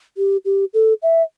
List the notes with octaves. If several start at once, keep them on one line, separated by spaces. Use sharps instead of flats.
G4
G4
A4
E5